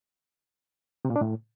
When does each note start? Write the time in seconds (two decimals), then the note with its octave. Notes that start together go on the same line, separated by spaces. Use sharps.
1.05 C3
1.10 A#2
1.16 D4
1.21 A2